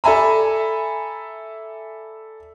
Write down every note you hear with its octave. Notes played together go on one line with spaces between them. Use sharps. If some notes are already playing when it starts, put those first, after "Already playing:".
A4 D5 E5 G#5 A#5 B5